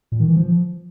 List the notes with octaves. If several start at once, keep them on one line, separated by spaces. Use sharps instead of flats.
A#2
D#3
E3
F3